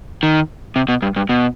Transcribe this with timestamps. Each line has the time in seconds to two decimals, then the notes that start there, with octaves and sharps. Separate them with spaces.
0.23 D#3
0.76 C3
0.89 B2
1.02 G2
1.16 G2
1.29 B2